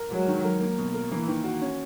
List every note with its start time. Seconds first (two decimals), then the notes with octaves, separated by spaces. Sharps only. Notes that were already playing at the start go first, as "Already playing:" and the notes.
Already playing: A#4
0.11 F#3 G#3
0.28 D#3
0.44 A#4
0.61 A#3
0.78 B2
0.94 A#4
1.11 E3 A#3
1.28 D#3
1.44 F#4
1.61 C#4